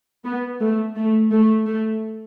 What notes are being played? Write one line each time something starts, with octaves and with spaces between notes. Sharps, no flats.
B3
A3
A3
A3
A3